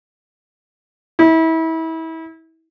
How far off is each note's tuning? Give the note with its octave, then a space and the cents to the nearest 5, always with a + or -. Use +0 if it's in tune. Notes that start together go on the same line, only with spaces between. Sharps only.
E4 -30